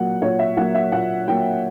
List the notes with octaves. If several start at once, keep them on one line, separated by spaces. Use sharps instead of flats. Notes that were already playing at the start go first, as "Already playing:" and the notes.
Already playing: A#2 F#3 A#3 F#5
A#2 C#5
E5
F#3 A#3 F#5
E5
A#2 F#5
F#3 A#3 G5